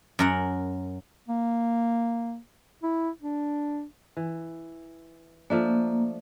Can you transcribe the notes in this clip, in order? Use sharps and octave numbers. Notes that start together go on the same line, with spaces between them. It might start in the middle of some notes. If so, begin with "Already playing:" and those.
F#2 A#4 F#5
A#3
E4
D4
E3
F3 A3 A#3 D4